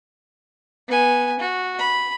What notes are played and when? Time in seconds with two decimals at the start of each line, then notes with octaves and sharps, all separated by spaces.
0.89 B3 G#5
1.40 F#4
1.79 B5